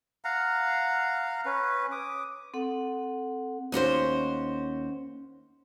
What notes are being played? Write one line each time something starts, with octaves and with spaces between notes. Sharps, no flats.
F5 F#5 A#5
C#4 B4
D6 D#6
C4 A4 F#5
D#2 C#4 F#4 C5